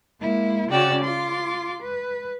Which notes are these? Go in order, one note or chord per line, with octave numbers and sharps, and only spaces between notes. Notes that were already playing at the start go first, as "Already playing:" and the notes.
G#3 A#3 E4
C#3 C#4 F#4 D5 G5 E6
F4 C6 D6
B4